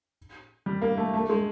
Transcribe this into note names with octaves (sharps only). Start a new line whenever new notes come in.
G3
A#3
A3
A3
G#3